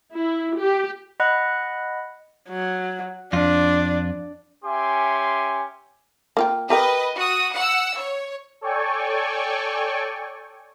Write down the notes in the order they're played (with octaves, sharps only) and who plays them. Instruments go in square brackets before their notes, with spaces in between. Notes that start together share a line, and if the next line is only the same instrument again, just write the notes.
[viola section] E4
G4
[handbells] D#5 F#5 B5 F#6
[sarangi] F#3
[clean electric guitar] F2 F4 [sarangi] D4
[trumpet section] C#4 G4 E5 G#5 C6 D6
[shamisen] A#3 F4 G5
[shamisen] G4 A#4 G5 [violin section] B4 D#5
[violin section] F#4 D#6
F#5 E6
C#5
[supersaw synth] A4 C#5 D5 G5 G#5 C#6